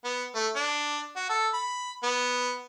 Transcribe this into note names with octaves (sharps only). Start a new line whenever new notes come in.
B3
A3
D4
F#4
A4
B5
B3